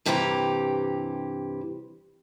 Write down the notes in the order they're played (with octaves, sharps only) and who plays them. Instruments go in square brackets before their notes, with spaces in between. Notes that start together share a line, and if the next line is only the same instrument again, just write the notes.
[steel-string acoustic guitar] G2 C3 E3 G4 B4 A#5